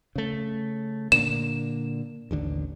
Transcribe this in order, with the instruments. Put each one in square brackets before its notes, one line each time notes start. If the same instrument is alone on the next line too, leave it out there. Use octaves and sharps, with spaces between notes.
[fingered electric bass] C#3 A3
[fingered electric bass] A#2 D3 A#3 [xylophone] E7
[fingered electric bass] A1 D#2 D3